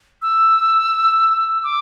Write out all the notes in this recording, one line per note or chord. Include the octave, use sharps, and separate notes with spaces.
E6
D6